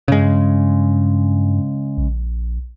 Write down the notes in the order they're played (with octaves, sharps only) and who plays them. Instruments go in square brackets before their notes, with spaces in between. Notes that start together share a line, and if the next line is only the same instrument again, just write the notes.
[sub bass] G2 [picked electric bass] C#3 G#3
[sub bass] A#1